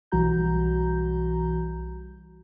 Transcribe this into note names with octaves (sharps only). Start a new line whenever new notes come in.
B1 E3 G3 F#4 A#5 G6